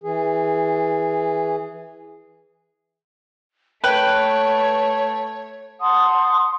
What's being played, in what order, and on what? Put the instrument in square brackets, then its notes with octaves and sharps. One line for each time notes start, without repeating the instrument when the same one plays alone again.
[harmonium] E3 G#4
[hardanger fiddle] A3 [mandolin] B4 [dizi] C#5 [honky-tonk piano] G5
[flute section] F#5 A5 C6 D#6